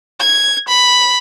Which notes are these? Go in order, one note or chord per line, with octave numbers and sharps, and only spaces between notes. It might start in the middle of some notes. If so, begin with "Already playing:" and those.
G#6
B5